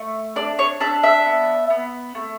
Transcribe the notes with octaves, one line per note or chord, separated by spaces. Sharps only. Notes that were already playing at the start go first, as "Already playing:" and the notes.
Already playing: A3
D4 D5
C#5
D4 E5
E5
B3
B3
A3